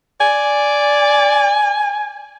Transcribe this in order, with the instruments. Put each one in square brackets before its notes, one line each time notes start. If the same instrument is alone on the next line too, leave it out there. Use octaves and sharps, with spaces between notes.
[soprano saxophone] D5 [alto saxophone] G#5